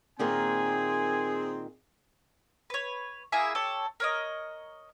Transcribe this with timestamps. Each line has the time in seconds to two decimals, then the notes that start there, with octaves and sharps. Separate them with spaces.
0.19 A#2 D#3 A#3 C4 G#4 G#5
2.70 B4 C#5
3.32 A#3 E4 G#4 E5
3.55 G4 A4 C#5
4.00 A#4 C#5 D#5